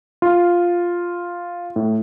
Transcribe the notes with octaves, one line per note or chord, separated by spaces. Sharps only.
F4
A2